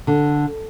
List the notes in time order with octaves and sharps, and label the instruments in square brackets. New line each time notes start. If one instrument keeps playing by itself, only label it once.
[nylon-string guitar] D3